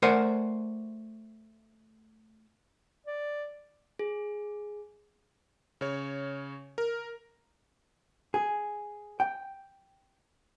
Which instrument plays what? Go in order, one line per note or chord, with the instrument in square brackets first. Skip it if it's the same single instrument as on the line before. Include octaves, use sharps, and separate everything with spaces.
[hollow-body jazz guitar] A3 A#4 C5 D5 F#5 G#5
[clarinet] D5
[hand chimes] G#4
[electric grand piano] C#3 C#5
A#4
[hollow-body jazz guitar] G#4
G5